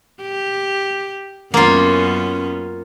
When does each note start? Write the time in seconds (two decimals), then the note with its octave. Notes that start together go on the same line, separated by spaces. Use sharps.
0.21 G4
1.54 F#2 A#3 B3 C#4 F4